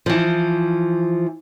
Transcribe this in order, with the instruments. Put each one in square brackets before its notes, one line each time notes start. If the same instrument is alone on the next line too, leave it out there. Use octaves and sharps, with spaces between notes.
[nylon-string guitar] E3 F3